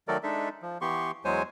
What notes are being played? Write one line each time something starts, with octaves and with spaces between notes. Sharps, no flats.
D#3 F#3 A3 A4 A#4 D5
G#3 D4 D#4 A4 E5
F3
E3 B3 G4 C6 C#6
E2 F#3 G#3 C5 C#5 G#5